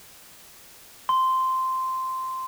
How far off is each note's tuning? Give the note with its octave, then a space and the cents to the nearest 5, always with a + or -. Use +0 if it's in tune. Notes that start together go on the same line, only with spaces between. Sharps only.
C6 -10